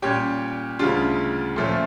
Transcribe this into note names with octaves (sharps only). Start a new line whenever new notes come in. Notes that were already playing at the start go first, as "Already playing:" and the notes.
A#2 G3 C#4 G4 C#5
D2 C#3 G3 D4 F4
A#2 F3 A3 C#4